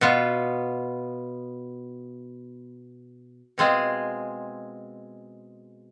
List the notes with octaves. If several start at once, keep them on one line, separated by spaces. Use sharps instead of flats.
B2 B3 F4
B2 G#3 C4 F4 G#4